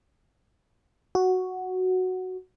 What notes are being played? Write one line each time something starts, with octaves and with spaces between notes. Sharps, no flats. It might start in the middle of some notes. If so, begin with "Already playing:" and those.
F#4